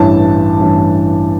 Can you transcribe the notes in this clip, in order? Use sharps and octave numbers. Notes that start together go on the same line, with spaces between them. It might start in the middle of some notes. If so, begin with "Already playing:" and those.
Already playing: A1 G2 E3 A5
A1 G2 E3